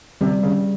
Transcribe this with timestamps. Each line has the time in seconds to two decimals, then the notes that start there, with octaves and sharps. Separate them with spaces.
0.21 C3 G3
0.43 C#3